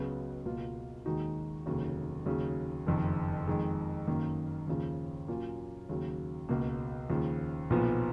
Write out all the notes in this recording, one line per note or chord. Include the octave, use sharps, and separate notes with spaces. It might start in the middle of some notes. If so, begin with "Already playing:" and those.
Already playing: C#2 C#3 F#3 B3 F#4
C#2 B2 A#3 F4
D#2 D#3 G#3 D#4 F#4
F1 D#2 C#3 F#3
D#2 C#3 F#3
F#1 F2 D#3
F2 D#3 G#3
F#2 D#3 A#3
D#2 C#3 F3
A#2 F#3 A#3 C#4 F4
D#2 C#3 F#3
C#2 B2 A#3
D#2 C#3 F3
B1 A#2 F3 B3